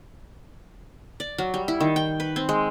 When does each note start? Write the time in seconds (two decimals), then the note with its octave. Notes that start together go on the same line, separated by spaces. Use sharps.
1.20 D5
1.38 F#3
1.54 G3
1.68 E4
1.80 D#3
1.96 G5
2.20 B4
2.36 C4
2.49 G#3